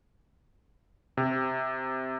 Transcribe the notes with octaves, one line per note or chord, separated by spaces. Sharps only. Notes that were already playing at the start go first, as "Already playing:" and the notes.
C3